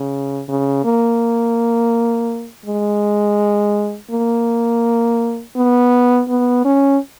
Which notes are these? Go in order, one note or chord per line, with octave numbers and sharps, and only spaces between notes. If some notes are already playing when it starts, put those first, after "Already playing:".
Already playing: C#3
C#3
A#3
G#3
A#3
B3
B3
C#4